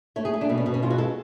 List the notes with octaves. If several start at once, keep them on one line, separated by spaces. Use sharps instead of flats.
A3 C#5
G#4
A3
D4
B2 B3
C#4
B2 B3
C#4
G#3 F4
F#4
G#3 A4